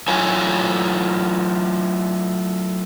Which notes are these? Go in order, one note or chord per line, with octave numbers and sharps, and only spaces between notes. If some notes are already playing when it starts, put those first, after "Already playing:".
F#3 A3 E4 F4 C#5 G#5